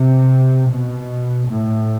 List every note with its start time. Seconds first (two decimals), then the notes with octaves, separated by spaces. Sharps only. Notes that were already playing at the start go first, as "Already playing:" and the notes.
Already playing: C3
0.70 B2
1.49 A2